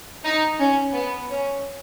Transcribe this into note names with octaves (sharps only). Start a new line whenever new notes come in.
D#4
C#4
B3
C#4